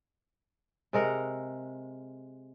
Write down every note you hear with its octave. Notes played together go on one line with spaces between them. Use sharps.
C3 G#3 A#4 F#5